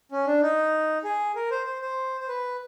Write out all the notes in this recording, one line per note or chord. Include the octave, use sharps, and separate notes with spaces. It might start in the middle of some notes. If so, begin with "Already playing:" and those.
C#4
D4
D#4
G#4
A#4
C5
C5
C5
C5
B4